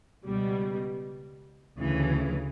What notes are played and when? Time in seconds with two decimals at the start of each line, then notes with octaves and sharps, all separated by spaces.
0.24 C#2 B2 G3
1.77 D2 C#3 E3